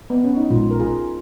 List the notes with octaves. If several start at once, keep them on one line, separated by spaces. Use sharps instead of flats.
B3
C#4
D#4
A#1 A#2 G#3 F4
A#4
F4 G#4